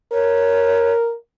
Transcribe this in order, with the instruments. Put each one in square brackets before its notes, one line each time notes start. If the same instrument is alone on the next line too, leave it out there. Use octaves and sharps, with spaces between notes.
[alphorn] A#4 [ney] C#5